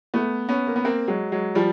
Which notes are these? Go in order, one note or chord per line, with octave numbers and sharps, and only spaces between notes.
A3 B3
B3 C#4
A#3
B3
A#3 C4
F#3 G#3
F#3 G#3
F3 G3